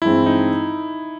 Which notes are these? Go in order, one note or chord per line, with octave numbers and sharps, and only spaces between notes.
G2 E3 G#3 C4 E4
D#4